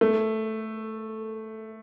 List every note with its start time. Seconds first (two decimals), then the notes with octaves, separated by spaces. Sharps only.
0.01 A3